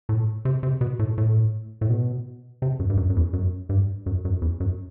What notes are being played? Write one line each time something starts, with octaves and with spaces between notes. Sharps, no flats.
A2
C3
C3
B2
A2
A2
A2
B2
C3
F#2
G2
F#2
F#2
E2
F#2
G2
F#2
F#2
E2
F#2